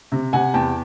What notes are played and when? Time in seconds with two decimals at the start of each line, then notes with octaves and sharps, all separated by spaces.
0.12 C3
0.33 C3 F#5 G#5
0.54 E2 G5 A5